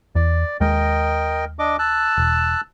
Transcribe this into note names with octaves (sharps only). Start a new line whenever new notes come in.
E2 D5
D#2 G#3 A#4 D#5 G5
D4 D#5 D6
A5 E6 F#6
E1